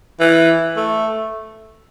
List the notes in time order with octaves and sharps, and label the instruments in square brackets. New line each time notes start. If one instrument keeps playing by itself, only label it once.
[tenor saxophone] E3
A3